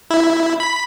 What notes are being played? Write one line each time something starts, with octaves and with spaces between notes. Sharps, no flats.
E4
B5